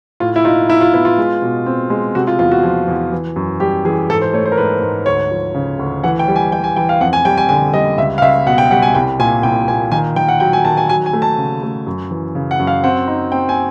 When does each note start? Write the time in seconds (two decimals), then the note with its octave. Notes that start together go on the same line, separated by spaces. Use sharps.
0.20 A2 F4
0.36 E4
0.45 D#4 F4
0.69 D#4 E4
0.81 F4
0.94 B3 E4
1.05 F4
1.18 G#3
1.42 B2
1.66 C4
1.90 G#3
2.15 C3 F#4
2.27 F4
2.39 E2 F4
2.51 F#4
2.63 F3
2.88 E2
3.12 E3
3.36 F#2
3.60 G3 G4
3.85 E3 G#4
4.09 G#2 A4
4.22 C5
4.33 A3 C#5
4.46 C5
4.52 A#4
4.57 G#2 B4
4.82 G#2
5.06 D2 C#5
5.31 F3
5.55 C#3
5.79 D2
6.04 E3 F#5
6.19 G5
6.28 G3
6.36 G#5
6.52 G3 G5
6.64 G#5
6.76 E3 G5
6.89 F5
7.01 F2 F#5
7.13 G#5
7.25 G3 G5
7.38 G#5
7.49 D3 G#5
7.74 G3 D#5
7.98 C#2 E5
8.18 F5
8.22 C#2 E5
8.47 B2 F#5
8.58 G5
8.71 G3 F#5
8.82 G#5
8.95 C2 G5
9.19 A#2 G#5
9.43 C2 G5
9.68 A#2 G#5
9.92 D#3 G#5
10.16 D#3 G5
10.28 F#5
10.40 F#3 G5
10.53 G#5
10.65 D#3 A5
10.77 G#5
10.89 F#3 G#5
11.06 G#5
11.13 A3
11.22 A5
11.38 C#3
11.63 A3
11.87 F#2
12.11 E3
12.35 C#3
12.51 F#5
12.59 F#2
12.67 F5
12.84 C4 F#5
13.08 D#4
13.32 C4 G5
13.49 G#5